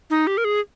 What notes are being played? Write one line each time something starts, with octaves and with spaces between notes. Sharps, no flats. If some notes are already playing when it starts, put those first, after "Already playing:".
D#4
G4
A#4
G#4